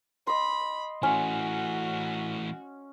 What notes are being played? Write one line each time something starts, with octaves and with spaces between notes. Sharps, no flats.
D#5 B5 C6
E3 A3 C#4 F#4 G#5